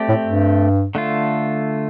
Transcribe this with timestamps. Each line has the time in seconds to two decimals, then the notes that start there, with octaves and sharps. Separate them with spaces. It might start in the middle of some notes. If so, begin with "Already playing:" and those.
Already playing: A3 C4 G4 D5
0.09 A2
0.25 G2
0.95 D3 A3 F4